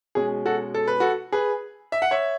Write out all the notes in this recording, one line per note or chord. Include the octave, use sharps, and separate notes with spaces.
B2 G#3 C#4 G#4
F#4 A4
A4
B4
F#4 A4
G#4 B4
E5
F#5
C#5 E5